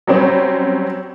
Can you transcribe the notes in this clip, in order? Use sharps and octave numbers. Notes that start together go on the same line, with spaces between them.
F#3 G3 C4 C#4